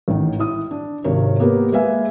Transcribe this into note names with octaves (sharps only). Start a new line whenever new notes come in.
A1 D#3
E4 D#6
D4
G#1 C3 A#4 C#5
A#3 B3 G4 A#4 B4
G#3 A#3 B4 E5 F5 G#5